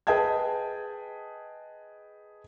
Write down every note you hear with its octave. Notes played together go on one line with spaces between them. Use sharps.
G#4 B4 D#5 G5 A5 G#6